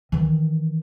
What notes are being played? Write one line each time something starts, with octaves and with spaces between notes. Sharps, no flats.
D#3 E3